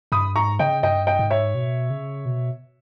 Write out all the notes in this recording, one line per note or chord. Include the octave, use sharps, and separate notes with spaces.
G2 B5 D#6
G#2 A#5 C#6
C#3 D#5 G5
G2 D#5 G5
D#5 G5
G#2
C#5 E5
B2
C#3
B2